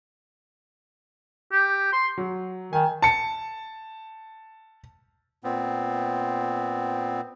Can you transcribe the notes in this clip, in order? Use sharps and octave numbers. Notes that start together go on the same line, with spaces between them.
G4
C6
F#3
D#3 G#5
A5 C#7
A#2 B3 C4